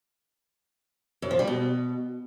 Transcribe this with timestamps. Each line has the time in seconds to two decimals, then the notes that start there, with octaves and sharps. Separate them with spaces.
1.22 F#2
1.31 F3
1.39 G3
1.47 B2